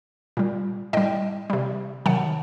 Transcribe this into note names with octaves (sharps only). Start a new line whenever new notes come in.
A#2 G3
A2 G3 D#5 G5
C3 G3
C3 D#3 F#3 F#5 A5